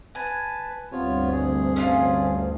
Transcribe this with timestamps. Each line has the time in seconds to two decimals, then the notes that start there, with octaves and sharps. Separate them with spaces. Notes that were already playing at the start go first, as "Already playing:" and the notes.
0.15 B4 G#5 A5
0.92 D2 G2 C3 B3 F4 C#5
1.32 G#4
1.76 C#4 D4 F4